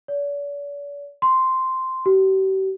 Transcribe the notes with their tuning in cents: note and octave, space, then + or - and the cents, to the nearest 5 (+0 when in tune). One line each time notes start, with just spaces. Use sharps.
D5 -45
C6 -5
G4 -40